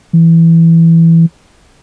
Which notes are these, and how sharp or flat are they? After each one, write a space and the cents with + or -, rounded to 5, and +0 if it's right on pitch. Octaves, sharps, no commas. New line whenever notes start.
E3 +5